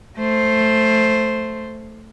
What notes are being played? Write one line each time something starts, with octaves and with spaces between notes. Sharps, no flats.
A3 C5